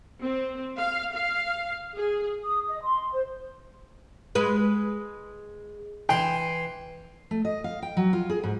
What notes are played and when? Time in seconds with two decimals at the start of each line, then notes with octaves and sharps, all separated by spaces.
0.21 C4
0.78 F5
1.13 F5
1.97 G#4
2.44 D#6
2.68 D#5
2.83 C6
3.13 C5
4.35 G#3 B4
6.09 E3 G5 C6
7.31 A3
7.45 D#5
7.64 F5
7.82 G5
7.97 F#3
8.13 F4
8.30 G#4
8.43 G#2